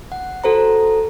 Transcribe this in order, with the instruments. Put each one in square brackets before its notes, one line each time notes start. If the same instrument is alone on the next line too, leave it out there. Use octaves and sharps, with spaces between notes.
[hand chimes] F#5
F#4 A4 C5 A#5